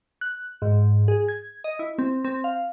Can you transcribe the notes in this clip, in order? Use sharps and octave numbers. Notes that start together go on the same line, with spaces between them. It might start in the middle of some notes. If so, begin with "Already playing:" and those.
F#6
G#2
G#4
G#6
D#5
E4
C4
C4
F5